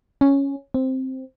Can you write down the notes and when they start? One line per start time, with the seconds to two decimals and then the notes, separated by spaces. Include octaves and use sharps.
0.21 C#4
0.74 C4